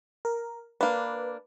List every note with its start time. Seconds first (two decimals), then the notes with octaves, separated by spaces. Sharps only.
0.25 A#4
0.81 A#3 D4 B4